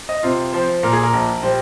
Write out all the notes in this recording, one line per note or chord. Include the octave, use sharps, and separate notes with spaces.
D#5
C3 F4
F3 C5
A#2 A#4
G#4
A#4
A#1
G3 C5